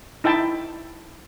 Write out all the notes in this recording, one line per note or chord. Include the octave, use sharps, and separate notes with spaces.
D#4 E4 E5 G5 A5